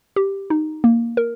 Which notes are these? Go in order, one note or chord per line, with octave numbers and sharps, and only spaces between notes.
G4
D#4
A#3
A#4